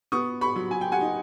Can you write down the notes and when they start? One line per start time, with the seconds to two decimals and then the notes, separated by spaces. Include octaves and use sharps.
0.12 B3 C#6 D#6
0.41 B5 C#6
0.56 F#3
0.71 G#5
0.81 G5
0.92 F#5 G#5
1.01 D#4